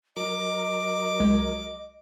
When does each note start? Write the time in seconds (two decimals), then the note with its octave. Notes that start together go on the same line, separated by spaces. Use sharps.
0.16 F#3 A#4 D#5 D6
1.20 C2 G#3 G#6